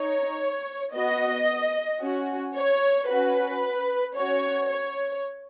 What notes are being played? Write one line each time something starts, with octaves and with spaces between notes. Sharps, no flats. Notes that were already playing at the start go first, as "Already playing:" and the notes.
Already playing: D#4 C#5
B3 F#4 D#5
C#4 F#4
C#5
C#4 F#4 B4
C#4 F#4 C#5
C#5